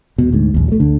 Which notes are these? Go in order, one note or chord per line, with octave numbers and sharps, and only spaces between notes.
D#1 B2
D2 G#2
A#1 D#2
F#3 A3
D2 D3